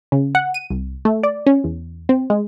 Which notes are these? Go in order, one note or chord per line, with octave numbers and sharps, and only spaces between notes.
C#3
F#5
D#7
C2
A3
D5
C#4
E2
C4
G#3